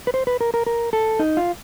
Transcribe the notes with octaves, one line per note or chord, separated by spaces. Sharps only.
B4
C5
B4
A#4
A#4
A#4
A4
D#4
F4